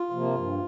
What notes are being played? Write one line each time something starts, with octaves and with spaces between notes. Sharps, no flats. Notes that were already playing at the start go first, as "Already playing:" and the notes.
Already playing: F4
C3 F3 A#3
G2